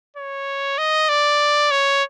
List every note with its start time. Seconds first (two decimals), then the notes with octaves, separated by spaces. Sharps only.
0.17 C#5
0.78 D#5
1.09 D5
1.71 C#5